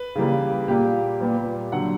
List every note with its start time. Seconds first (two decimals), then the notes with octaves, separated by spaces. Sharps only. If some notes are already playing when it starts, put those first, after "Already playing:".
Already playing: B4
0.15 C#3 E3 G3 A#3
0.68 A#2 A#3 G4
1.21 A#2 G3 B3
1.72 D3 F#3 F#5